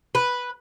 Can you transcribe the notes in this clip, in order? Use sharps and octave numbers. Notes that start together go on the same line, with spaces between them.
B4